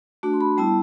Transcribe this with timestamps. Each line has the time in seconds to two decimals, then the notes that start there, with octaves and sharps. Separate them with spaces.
0.23 A3 D4 F#4
0.33 C6
0.41 B5
0.57 G3 B3 E4 A5